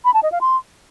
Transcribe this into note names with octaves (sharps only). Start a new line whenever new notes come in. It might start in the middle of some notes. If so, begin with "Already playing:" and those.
B5
A5
D#5
F5
C6